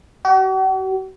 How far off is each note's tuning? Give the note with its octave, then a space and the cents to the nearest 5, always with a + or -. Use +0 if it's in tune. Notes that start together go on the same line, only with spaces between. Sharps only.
F#4 +45